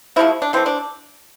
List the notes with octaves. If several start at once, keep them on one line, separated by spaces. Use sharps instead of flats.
C3 F3 A3 E4
D4
E3 A3 C4
D4